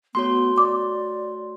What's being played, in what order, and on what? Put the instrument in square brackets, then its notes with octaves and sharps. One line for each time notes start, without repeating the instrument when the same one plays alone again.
[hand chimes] A3 F#4 C#5 [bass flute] B3 [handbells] C6
[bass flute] D5 [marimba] D6